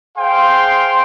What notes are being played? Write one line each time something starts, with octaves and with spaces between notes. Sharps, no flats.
G#4 C5 F5 G5 C6